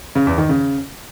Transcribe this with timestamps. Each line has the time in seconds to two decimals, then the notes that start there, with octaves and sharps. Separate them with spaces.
0.15 C#3
0.27 E2
0.38 D#3
0.49 C#3